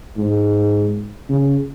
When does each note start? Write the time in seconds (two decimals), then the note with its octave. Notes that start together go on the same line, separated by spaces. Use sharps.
0.18 G#2
1.29 C#3